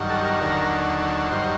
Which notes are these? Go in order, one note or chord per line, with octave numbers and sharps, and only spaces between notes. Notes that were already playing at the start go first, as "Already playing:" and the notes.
Already playing: G2 D#3 F#3
A4
A#4
D#2 D3 F#3 A#4
G2 D#3 F#3 C5